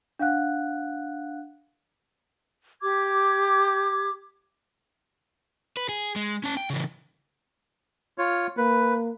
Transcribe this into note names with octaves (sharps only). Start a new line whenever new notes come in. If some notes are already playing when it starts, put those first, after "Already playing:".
D4 F5 F#5 F#6
G4 D6 G#6
B4
G#4
G#3
C#4 A5
G5
C#3 E3
F4 C#5
A#3 B4